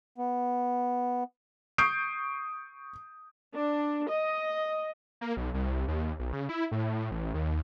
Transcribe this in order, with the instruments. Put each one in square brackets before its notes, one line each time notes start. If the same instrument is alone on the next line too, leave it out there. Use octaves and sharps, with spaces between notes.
[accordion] B3
[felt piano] C#6 D#6 G6 C7 D7
[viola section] D4
D#5
[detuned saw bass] A#3
B1
C2
D#2
B1
C#3
E4
A2
A1
D#2